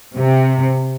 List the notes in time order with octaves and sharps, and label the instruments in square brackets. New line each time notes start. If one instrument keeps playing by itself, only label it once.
[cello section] C3